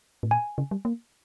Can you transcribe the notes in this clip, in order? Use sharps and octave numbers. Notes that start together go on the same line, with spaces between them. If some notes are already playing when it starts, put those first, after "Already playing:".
A2
A#2 G#5
C#3
G3
A#3